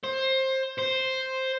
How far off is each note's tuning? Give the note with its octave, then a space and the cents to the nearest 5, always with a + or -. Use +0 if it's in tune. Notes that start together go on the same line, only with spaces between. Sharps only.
C5 +20
C5 +5